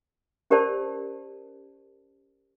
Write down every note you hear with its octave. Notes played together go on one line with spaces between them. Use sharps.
C#4 G4 A#4 C5 D5 A5